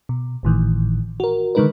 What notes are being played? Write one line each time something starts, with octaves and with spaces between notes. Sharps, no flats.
B2
G#1 A2 D#3 E3
F#4 A#4
D3 D#3 G#3 D#4 A#4 B4